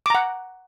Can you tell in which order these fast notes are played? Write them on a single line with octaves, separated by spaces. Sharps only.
D6 A#5 F#5